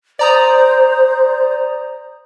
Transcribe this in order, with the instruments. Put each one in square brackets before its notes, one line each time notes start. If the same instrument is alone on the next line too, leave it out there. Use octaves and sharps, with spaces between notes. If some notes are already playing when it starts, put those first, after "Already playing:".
[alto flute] C5 [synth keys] D5 A#5 D#6